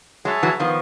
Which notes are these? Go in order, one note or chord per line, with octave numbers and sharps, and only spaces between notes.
F#3 G#3 G#4 C#5 E5 A5
E3 F#3
D#3 F3 B3